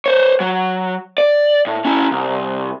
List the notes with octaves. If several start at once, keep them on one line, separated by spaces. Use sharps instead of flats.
C5 C#5
F#3
D5
A2
C#4 E4
C2